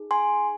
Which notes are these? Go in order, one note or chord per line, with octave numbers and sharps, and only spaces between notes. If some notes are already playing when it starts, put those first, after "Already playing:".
Already playing: D#4 G#4
G#5 C6